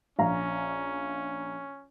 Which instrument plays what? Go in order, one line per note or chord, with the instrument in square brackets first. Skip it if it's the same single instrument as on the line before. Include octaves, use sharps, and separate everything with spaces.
[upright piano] A#1 F5 A#5 [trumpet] C#4